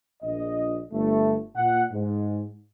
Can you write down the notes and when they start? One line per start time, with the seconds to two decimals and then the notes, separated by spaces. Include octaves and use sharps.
0.22 A#1 D#5
0.92 G1 A3
1.56 A#2 F#5
1.92 G#2